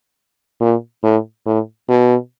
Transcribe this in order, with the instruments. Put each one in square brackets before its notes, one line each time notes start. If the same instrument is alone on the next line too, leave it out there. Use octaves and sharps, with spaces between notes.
[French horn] A#2
A2
A2
B2